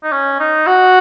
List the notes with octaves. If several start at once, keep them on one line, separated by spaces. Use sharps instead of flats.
D#4
C#4
D#4
F#4